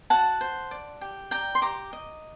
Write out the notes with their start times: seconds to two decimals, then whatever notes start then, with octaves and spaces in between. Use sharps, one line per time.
0.10 F#4 F#5 A5
0.41 C5
0.71 D5
1.01 G4
1.31 D5 G5 A#5
1.55 C6
1.62 G4 A#5 D6
1.93 D#5